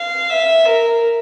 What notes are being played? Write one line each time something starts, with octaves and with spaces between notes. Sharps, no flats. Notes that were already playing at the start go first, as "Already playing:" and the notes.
Already playing: F5
E5
A#4